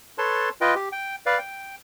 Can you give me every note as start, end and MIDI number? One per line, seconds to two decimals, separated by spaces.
0.18 0.49 69
0.18 0.49 71
0.18 0.49 73
0.18 0.49 81
0.18 0.49 84
0.61 0.74 65
0.61 0.74 71
0.61 0.74 75
0.61 0.74 79
0.75 0.89 67
0.92 1.16 79
1.26 1.38 71
1.26 1.38 74
1.26 1.38 77
1.39 1.76 79